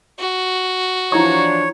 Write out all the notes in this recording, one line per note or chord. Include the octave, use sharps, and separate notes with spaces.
F#4
E3 F3 D4 E4 C#5 A#5 C#6